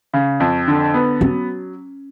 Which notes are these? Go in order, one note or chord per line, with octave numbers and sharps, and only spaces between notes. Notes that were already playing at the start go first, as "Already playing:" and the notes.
C#3
F2
D3
B3
F#3 C#4